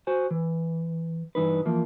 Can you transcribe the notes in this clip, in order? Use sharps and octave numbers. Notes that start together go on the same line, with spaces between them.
F#4 C5 G#5
E3
G2 E3 D#4 B4
E3 F3 A#3